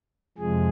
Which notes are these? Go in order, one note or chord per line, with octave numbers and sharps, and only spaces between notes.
F2 C3 F3 G#3 G#4